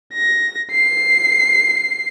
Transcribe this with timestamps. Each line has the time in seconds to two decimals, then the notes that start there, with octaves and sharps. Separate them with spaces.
0.13 A#6
0.72 C7